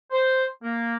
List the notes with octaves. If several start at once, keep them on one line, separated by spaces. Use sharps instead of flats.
C5
A#3